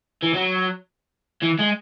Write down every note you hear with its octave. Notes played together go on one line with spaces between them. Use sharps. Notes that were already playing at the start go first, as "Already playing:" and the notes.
E3
F#3
E3
G#3